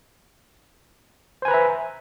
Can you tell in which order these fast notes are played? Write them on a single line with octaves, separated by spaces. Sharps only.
C5 G#5 B4 A#5 E5